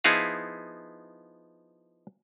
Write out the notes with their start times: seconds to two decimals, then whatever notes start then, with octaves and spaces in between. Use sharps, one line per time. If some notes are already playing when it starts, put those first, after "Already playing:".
0.04 F3 B3 D#4 E4 G#4 F5